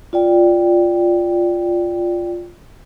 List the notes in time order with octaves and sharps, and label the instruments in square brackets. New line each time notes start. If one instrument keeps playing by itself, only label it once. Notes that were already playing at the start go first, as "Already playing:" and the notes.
[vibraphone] F4 D5 G5